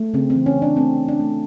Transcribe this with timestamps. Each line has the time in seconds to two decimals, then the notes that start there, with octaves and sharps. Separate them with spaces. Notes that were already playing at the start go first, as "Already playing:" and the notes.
Already playing: A3
0.14 C#3 C4
0.30 C4
0.35 E3
0.46 C#4
0.56 E3
0.62 D4
0.77 A3 C4
0.98 E3
1.08 D4
1.20 A3